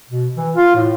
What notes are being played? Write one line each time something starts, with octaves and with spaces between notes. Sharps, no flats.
B2
E3
F4
A2